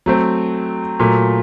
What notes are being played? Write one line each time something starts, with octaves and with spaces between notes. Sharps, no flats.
F#3 A3 C4
A#2 F#3 A3